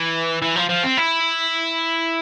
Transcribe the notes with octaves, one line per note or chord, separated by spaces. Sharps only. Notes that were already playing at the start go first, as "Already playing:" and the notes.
Already playing: E3
E3
F3
F3
C4
E4